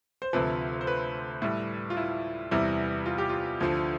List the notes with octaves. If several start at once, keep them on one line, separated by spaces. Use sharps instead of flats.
C5
D2 C3 F3 B4
C5
B4
A2 G3
F4
E4
E2 C3 E3 G3 E4
F4
G4
F4
D2 D3 F3